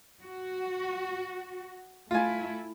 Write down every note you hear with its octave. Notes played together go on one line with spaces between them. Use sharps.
F#4
A3 E4 F4 G#5